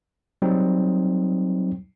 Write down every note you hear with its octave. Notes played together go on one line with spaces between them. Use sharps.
F#3 G3 C4 D#4